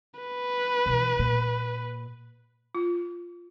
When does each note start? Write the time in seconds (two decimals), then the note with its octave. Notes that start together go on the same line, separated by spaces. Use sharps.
0.20 B4
0.86 B2 E3
1.19 A#2
2.75 F4